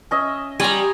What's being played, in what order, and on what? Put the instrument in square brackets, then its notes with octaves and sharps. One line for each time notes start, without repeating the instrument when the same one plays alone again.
[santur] C#4 D#5 E5
[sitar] G3 [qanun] G#5 A#5 [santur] C6 C#6